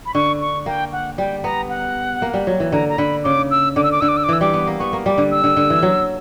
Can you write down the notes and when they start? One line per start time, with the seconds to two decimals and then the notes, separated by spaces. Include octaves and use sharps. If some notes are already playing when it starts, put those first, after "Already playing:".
0.06 B5
0.14 D3 C#6
0.41 C#6
0.66 A#3 G5
0.93 F#5
1.18 G3 G5
1.44 B3 A#5
1.69 F#5
2.22 A#3
2.34 G3
2.47 F#3
2.60 E3
2.72 D3 A#5
2.89 A#5
2.98 D3 B5
3.24 C#3 D6
3.51 E6
3.76 D3 D6
3.84 E6
3.92 D6
4.01 D3 E6
4.09 D6
4.17 E6
4.24 D6
4.29 E3 E6
4.41 G3 D6
4.53 B3
4.67 A#3
4.79 B3 C#6
4.93 A#3
5.06 G3 D6
5.18 D3
5.31 E6
5.44 D3
5.57 D3
5.70 E3
5.82 F#3